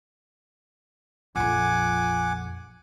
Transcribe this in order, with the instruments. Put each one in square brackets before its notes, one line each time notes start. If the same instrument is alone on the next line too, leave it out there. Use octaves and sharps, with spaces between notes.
[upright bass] A#1 F2 [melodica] F#5 G#5 D6